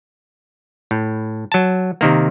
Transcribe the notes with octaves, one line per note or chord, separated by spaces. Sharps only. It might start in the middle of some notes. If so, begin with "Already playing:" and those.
A2
F#3 A5
C3 D#3 A#3